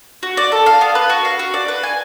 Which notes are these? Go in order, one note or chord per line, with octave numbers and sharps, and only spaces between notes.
F#4
D5
A4
F5
B3
B4
F#4
F5
F#4
D5
B4
G#5